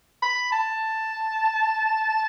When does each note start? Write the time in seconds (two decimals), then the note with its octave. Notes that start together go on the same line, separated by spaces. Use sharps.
0.22 B5
0.52 A5